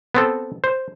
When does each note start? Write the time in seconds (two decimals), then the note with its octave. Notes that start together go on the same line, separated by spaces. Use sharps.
0.15 B3 C4 A4
0.64 C5